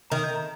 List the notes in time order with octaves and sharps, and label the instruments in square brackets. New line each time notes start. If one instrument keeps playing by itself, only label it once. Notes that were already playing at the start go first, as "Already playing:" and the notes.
[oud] D#3 [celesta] A#5
[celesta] G6
A#5